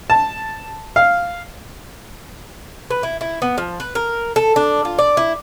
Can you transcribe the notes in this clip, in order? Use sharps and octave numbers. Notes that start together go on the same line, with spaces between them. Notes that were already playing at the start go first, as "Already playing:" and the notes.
A5
F5
B4
E4
E4
B3
F3
B4
A#4
A4
D4
F4
D5
E4